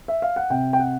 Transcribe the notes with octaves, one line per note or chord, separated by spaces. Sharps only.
E5
F5
F#5
C3 G5
G5
F#5